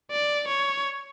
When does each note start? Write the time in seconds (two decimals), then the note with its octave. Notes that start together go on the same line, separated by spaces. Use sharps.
0.11 D5
0.48 C#5